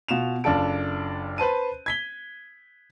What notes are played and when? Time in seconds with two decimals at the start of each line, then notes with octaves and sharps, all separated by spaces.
0.08 B2 F4 E7 F7
0.44 F#1 D4 F4 A4 D7
1.38 B4 C5 A5 D#7
1.86 G#6 B6 G7